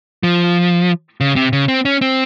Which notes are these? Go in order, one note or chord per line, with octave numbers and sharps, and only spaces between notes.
F3
C#3
C3
C#3
C4
C#4
C4